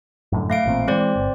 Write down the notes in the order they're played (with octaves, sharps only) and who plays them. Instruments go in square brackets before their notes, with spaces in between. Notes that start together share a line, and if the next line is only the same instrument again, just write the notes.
[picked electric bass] F#2 A2 D3
[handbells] A3 F5 D7
[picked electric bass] A1 A#2 C4
[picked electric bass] E3 G#3 [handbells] C4 C5 D5
[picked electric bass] G1